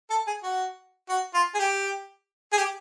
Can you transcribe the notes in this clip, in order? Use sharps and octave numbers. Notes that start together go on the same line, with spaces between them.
A4
G#4
F#4
F#4
F4
G#4
G4
G#4
G4